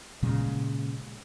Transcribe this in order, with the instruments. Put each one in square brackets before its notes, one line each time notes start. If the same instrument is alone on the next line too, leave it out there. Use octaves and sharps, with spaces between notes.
[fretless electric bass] A#2 C#3 G#3